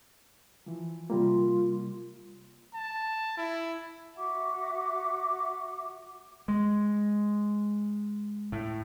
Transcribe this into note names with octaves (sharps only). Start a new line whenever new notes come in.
E3 F3
C3 G3 A#3 F4
A5
E4
F#4 E5 F#5 D6
G#3
A2